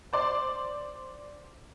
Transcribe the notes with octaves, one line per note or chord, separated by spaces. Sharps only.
C5 D5 C6